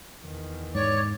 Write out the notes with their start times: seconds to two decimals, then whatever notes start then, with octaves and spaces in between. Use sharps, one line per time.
0.25 E2 D#3
0.75 G#2 C#5 D5